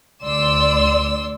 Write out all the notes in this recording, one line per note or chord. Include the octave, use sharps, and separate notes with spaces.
D2 D5 C6 E6